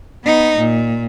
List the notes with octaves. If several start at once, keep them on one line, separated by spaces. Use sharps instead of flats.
B3 D#4
A#2